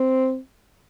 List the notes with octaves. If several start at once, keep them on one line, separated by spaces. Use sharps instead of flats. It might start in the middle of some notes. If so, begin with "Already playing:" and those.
Already playing: C4